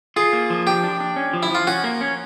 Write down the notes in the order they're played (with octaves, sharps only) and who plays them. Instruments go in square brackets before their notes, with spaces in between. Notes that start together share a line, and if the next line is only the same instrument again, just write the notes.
[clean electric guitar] F4 [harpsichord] G#4
[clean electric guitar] A#3
F3
[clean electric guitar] D4 [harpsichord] G4
[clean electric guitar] D4
D4
C#4
F3
[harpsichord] E4
[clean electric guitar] F3 [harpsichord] F4
[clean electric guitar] C#4 [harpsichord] F#4
[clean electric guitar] A#3
C#4